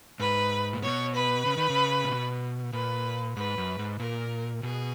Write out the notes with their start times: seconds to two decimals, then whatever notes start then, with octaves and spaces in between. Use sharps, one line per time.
0.20 G#2 B4
0.73 A#2
0.82 B2 C#5
1.14 B4
1.46 C#3
1.57 D#3
1.70 C#3
2.04 A#2
2.10 B2
2.73 A#2 B4
3.36 G#2 B4
3.58 F#2
3.79 G#2
4.00 A#2 A#4
4.63 B2 G#4